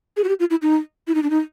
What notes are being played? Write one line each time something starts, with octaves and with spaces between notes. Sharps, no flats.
G#4
F#4
G4
F4
E4
D#4
E4
D#4
D4
D#4